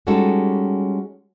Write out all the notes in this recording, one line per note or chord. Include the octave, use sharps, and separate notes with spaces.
G3 G#3 C#4 D#4 F#4 A4